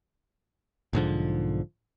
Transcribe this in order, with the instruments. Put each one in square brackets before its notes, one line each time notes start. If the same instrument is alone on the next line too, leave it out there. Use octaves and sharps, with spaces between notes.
[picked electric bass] B1 G#2 D3 F3